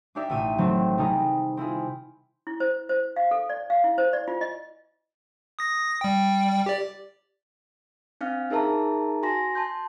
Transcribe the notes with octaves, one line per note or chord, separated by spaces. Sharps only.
D4 D#4 G4 D5 E5
A1 B2 E5 D#7
D#3 E3 F#3 G3 A3 C4
C3 G3 D#4 G#4 B4
C4 E4 F4 G#4
E4
C5
C5
F5
A4
D5
F5
E4
C5
D5
F4
D#5
D#6 A#6
G3 G5
G4 D5
C4 D4 F5 F6
D#4 G#4 A#4 E5 A5 A#5
F#4 G#5 C6 A#6
A5 C6 G6